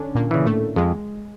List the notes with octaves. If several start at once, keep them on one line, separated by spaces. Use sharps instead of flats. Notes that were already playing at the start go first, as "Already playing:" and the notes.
Already playing: D3 C#4 D4
A#2 A#3
C#3 E3
A2 A3
F2 G#3